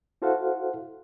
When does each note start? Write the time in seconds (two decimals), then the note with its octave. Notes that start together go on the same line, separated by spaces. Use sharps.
0.22 E4 F#4 A4 C5 F5 F#5